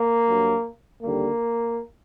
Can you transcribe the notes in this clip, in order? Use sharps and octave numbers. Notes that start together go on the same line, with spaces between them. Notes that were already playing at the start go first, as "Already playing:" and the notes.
Already playing: A#3
G2 F#3
D#2 D3 G3 A#3